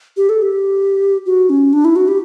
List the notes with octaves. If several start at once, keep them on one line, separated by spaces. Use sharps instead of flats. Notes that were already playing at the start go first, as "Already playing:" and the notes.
G4
A4
G4
F#4
C#4
D4
E4
F#4
G4